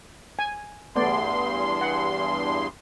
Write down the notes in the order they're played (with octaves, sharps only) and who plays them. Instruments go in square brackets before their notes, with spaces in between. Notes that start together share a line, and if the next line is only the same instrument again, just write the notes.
[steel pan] G#5
[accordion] E2 G2 C6 [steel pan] A3 B3 D5
[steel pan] F#5